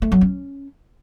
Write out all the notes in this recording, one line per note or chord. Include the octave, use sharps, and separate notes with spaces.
A3
F#3
C#4